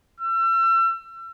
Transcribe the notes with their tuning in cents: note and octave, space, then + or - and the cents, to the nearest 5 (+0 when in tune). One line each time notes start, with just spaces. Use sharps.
E6 +35